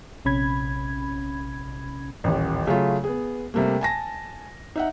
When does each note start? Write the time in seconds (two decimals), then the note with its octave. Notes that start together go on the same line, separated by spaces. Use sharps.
0.25 A#1 C3 C#4 B5 G#6
2.24 D#1 A1
2.67 C#3 F#3 A3 F4
3.04 B3 G#4
3.54 C3 G3 A3 A#3
3.81 G#5 A5 A#6
4.76 D#4 E5 F#5